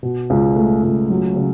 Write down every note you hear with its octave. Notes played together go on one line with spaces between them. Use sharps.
B2
C#2
A3
C#2
F#3
C#3